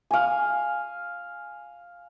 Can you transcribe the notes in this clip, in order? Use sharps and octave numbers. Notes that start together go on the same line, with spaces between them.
F5 G#5